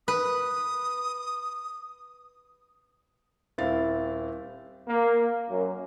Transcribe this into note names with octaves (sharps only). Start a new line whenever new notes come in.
B4 D#6
D#1 C4 E4 F5 A6
A#3
F#2